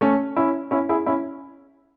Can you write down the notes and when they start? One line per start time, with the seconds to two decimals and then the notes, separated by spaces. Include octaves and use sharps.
0.01 A3 C#4
0.36 C#4 E4
0.71 C#4 E4
0.89 E4 G#4
1.06 C#4 E4